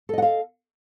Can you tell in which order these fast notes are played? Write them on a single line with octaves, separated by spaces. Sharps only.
A4 D#5 F#5 F5